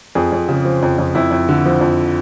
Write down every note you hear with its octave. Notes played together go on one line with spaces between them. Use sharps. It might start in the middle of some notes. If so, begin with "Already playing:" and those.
F2 G#4
F2
C#3
F3
F2
F2
F2 E4
F2
D3
F3
F2